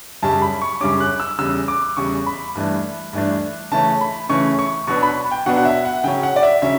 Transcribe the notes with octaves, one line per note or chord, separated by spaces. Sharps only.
F#2 C#3 G3 C#4 A5
B5
C#6
F#2 C#3 G3 C#4 D6
F#6
E6
E2 C#3 G3 E6
D6
E2 C#3 G3 C#6
B5
G2 E3 A3 D4
G2 E3 A3 D4
C#3 E3 A3 C#4 A5
B5
C#3 E3 A3 C#4 C#6
C#6
B2 F#3 B3 D4 C#6
B5
G5
B2 F#3 B3 D4 F#5
F#5
E5
F#5
C#3 F#3 C#4 G5
F#5
D5
E5
C#3 F#3 C#4 E5